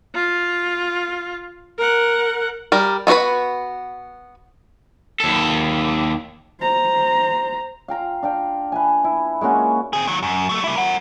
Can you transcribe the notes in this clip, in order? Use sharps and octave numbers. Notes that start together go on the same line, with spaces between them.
F4
A#4 F#5
G3 A#4
B3 D#4 F#4 B4 B5
D#2 A4
C5 A#5
F5 G5 A#5 C6
D4 F5 G5
B4 E5 G#5
E4
G#3 A#3 C#4 F#4
C4 G#4
D#3 F#3
F#2
F#3 A3
G3 E4
A#4 F#5